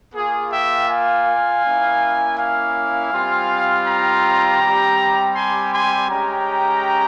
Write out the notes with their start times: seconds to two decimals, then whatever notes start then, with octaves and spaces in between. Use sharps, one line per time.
0.14 A#3 F4 G#4
0.51 E5 G5
0.89 F5 G#5
1.63 A#3 C#4 E4
2.37 F5 G#5
3.12 G3 C4 F4
3.86 G5 A#5
4.61 G3 C4 G4
5.35 G#5 C6
5.73 G#5 C6
6.10 G#3 C#4 G4 G5 A#5